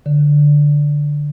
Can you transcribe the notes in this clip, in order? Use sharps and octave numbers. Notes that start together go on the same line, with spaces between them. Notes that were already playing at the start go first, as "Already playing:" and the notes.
D3